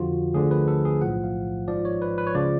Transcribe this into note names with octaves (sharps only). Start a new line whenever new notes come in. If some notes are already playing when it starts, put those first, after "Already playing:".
Already playing: F2 D3 F3 F4 F#4
D2 D3 F3 G#4
B4
A4
G#4
B1 A2 F3 F#5
F5
G#1 G#2 F3 D5
C#5
B4
B4
C#5
C#2 C#3 F3 D5